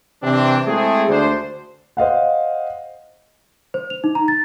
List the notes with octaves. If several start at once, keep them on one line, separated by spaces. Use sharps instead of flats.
C3 E3 C4 D4
G#3 A3 C4 E4 G#4
D2 D4 C5
C5 D#5 F5 F#5
C5
F7
D#4
A#5
A6